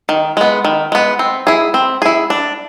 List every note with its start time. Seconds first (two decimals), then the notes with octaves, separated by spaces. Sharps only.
0.09 D#3
0.37 G#3 B3
0.65 D#3
0.92 G#3 B3
1.19 C4
1.47 E4 G#4
1.74 C4
2.02 E4 G#4
2.30 D4